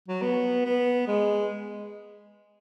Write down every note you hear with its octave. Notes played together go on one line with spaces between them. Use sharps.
F#3
B3
B3
G#3